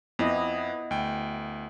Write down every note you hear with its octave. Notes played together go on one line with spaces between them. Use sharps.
F2 B3 E4 D#5
D2 G5